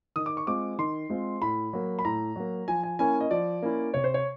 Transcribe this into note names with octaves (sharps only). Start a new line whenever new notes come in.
D#3 D#6
D6
C#6
G#3 C4 F4 D6
D#3 C6
G#3 C4 F4
A2 B5
F#3 A#3
B5
A2 A#5
F#3 A#3
F3 G#5
G#5
A#3 C#4 E4 G#5
D#5
F3 D5
A#3 C#4 E4
C3 C#5
C5
C#5